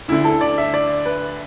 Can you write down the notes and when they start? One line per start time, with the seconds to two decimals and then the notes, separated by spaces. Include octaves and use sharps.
0.08 D2 D3 E4
0.24 A4
0.41 D5
0.58 E5
0.74 D5
1.06 B4